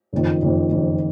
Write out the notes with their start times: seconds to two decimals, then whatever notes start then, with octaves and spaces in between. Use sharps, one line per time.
0.13 F#1 F2 D#3
0.42 F#1 F2 D#3
0.71 F#1 F2 D#3